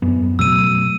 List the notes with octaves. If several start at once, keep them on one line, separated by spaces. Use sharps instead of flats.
F#2 B3
B2 F#3 A3 E6 D#7